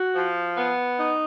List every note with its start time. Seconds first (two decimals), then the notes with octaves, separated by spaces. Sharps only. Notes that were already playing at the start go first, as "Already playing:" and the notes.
Already playing: F#4
0.15 F3
0.57 B3
0.99 D#4